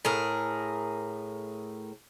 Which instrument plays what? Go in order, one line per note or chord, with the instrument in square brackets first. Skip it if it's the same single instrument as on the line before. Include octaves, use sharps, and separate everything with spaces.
[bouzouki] A2 G#4 A#4